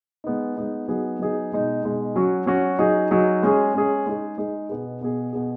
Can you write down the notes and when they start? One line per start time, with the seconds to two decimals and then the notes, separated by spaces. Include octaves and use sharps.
0.24 G#3 B3 D#4
0.57 G#3 B3 D#4
0.88 F#3 B3 D#4 G#4
1.19 F#3 B3 D#4 G#4
1.52 B2 G#3 D#4
1.83 B2 G#3 D#4
2.16 F#3 C#4 F#4
2.46 F#3 C#4 F#4
2.79 F#3 D#4 G#4
3.11 F#3 D#4 G#4
3.43 G#3 C#4 G#4
3.74 G#3 C#4 G#4
4.06 G#3 D#4 G#4
4.38 G#3 D#4 G#4
4.69 B2 B3 G#4
5.01 B2 B3 G#4
5.33 B2 B3 G#4